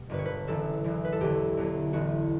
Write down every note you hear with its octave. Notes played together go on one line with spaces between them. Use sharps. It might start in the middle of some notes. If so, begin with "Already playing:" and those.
Already playing: B2 G3
G1 G2 D3 B4
C#5
B4
F#1 F#2 E3 A4
F#1 F#2 E3
B4
A4
E1 E2 D3 F#3 B3 G4
E1 E2 D3 F#3 B3
A1 A2 E3 B3 F#4